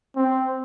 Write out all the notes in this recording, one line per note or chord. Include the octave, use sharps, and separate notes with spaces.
C4